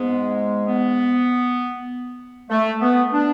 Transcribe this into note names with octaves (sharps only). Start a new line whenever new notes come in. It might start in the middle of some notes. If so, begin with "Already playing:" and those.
Already playing: G#2 G#3 B3
B3
A3
B3
D4